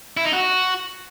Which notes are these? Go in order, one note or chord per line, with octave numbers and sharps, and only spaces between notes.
E4
D#4
F#4